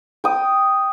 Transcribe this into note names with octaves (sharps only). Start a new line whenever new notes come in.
G5 D#6